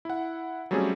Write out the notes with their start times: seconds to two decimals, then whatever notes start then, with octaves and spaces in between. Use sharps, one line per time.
0.05 E4 F#5
0.71 F#3 G3 A3 C4 C#4 G#4